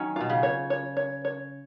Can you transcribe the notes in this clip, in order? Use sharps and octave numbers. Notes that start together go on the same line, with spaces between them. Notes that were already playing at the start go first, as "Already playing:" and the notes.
Already playing: D#3 F#3 C#4
B2 F4
C#3
C#5
C#5
C#5
C#5